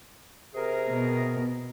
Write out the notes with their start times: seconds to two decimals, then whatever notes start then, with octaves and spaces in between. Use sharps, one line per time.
0.54 C3 G#4 A#4
0.89 B2